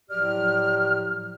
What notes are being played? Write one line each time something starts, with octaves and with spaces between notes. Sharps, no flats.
A2 F3 F#3 G4 D5 F6